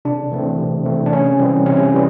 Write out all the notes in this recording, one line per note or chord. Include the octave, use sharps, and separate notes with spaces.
C3 D4
E3 A3 C4
C3
E3 A3 C4
D4
C3 C#4
E3 G3 C4
C3 C#4
E3 G3